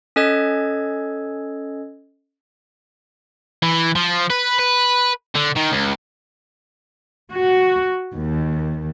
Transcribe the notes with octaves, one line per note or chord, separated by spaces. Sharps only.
C#4 A4 D#5 G#6
E3
F3
B4
B4
D3
D#3
C#2
F#4
D#2